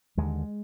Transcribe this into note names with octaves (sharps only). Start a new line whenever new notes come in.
D#2 D3 F3 G#3